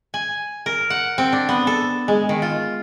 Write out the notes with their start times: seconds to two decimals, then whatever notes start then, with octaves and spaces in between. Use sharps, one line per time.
0.14 G#5
0.66 A#4
0.90 F#5
1.18 C4
1.32 D4
1.49 B3
1.67 A4
2.08 G#3
2.29 D#3
2.42 F4